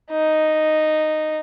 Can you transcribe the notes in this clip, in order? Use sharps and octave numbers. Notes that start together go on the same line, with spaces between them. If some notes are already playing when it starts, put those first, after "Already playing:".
D#4